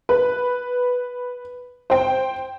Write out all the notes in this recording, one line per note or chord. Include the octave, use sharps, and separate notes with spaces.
B4
C5 G5